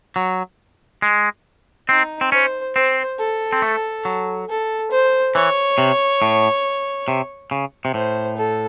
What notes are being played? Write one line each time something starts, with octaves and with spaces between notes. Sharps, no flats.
F#3
G#3
C4 D#4
C4
C#4 C5
C4 C5
A4
C4
A3
F#3
A4
C5
E3 C#5
C3
A2
C3
C#3
C3
A2 C5
A4